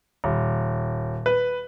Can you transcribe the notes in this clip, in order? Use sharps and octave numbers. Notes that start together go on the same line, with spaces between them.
D#1
B4